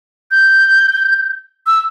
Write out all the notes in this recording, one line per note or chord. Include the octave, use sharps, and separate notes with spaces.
G6
E6